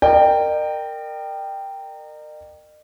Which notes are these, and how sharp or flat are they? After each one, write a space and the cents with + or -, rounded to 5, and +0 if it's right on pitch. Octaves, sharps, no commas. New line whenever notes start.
A#4 -15 D#5 -45 G5 +0